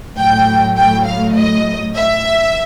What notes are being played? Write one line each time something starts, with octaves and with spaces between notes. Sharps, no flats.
A2 F#3 A3 G5
G5
F5
D#5
E5